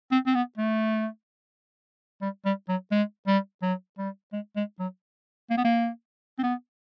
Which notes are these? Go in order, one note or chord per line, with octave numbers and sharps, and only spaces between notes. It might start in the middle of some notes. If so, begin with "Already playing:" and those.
C4
C4
B3
A3
G3
G3
F#3
G#3
G3
F#3
G3
G#3
G#3
F#3
A#3
B3
A#3
C4
B3